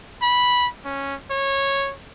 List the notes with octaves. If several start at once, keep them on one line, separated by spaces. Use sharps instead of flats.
B5
C#4
C#5